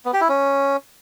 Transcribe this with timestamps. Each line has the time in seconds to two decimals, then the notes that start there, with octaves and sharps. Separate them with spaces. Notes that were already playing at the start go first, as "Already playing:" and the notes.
0.05 B3
0.13 G4
0.21 E4
0.29 C#4